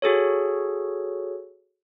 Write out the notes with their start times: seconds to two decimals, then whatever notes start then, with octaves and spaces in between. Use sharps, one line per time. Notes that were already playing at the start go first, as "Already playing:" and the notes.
0.02 F#4 G#4 A4 C#5